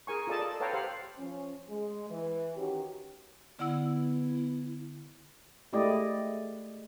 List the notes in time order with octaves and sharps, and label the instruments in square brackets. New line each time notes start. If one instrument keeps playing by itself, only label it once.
[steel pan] G#4 A#4 G#5 C#6
F4 G#4 A4 D5 D#5 A5
A4 D5
A4 B4 C#5 F5 G5 A#5
G4 C5 F5 F#5
[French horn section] F3 C#4
G#3
E3
D#3 E3 C#4 F#4 G4
[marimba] D3 F#5 E6 [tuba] B3 [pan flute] E4
[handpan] G#3 A3 E4 G4 D5 D#5